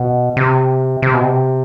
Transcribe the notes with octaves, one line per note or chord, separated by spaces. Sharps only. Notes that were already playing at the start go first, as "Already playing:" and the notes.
Already playing: B2
C3
C3
B2
C3